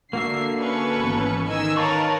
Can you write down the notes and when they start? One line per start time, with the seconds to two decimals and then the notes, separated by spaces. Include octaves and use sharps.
0.13 D3 A#3 F#4 E5 C7
0.60 C#4 A4 B4 C#6
0.98 G#1 E3 B3
1.48 D#3 D#5 G#5 E6
1.77 A#4 B4 C#5 F5 A5 C#6